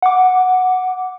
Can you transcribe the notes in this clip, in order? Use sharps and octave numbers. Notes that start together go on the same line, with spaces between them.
F#5 D6